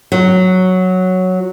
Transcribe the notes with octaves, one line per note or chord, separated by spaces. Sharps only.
F#3